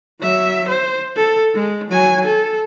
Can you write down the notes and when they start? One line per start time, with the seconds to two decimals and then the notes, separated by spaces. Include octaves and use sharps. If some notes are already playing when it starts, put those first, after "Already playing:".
0.20 F#3 E5
0.69 C5
1.16 A4
1.54 G#3
1.90 F#3 G#5
2.25 A4